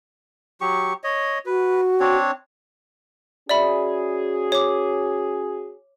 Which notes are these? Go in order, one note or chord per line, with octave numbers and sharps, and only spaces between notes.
F#3 G4 C#6
C#5 D#5
F#4 B4
C4 D4 C#5
C#4 F#4 G#4 D5 E5 B5
C#5 D6